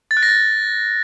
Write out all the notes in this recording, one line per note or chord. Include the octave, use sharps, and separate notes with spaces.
A6
F#6
A#6
A6